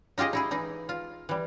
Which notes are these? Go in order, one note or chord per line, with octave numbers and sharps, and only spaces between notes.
D#4 F4 G4 G#4 D#5
D#4 E4 G#4
E3 D#4 G#4
F4
E3 G3